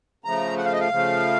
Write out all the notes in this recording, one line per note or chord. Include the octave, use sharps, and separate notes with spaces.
C#3 F3 A3 A#5
F#5
F5
D#5
F5
C#3 F3 A3